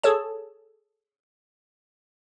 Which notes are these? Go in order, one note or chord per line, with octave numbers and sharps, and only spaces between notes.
G#4 A4 C#5 A5